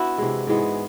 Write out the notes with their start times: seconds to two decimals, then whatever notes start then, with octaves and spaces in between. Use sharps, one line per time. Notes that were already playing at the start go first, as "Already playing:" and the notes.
Already playing: B3 D4 E4 F#4
0.18 C3 E3 G#3
0.47 G#2 E3 G#3 B3